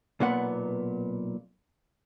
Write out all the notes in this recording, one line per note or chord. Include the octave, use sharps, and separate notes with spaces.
B1 A#2 B3 F#5